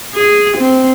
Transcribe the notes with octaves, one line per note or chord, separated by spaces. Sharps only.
G#4
C4